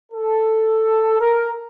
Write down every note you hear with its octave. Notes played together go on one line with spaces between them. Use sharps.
A4
A#4